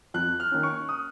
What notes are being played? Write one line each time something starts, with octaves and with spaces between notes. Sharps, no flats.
F2 F#6
F6
D#3 A#3 C#4
C#6
D#6